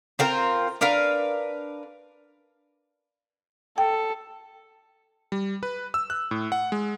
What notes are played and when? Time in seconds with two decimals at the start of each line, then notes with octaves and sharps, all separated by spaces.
0.19 C4 F4 A#4
0.81 D4 A#4 B4 F5
3.78 A4 G5
5.32 G3
5.63 B4
5.94 E6
6.10 F#6
6.31 A2
6.52 F#5
6.72 G#3